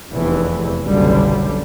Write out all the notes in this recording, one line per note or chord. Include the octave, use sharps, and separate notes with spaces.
F1 E2 E3
F#1 B1 D3 G3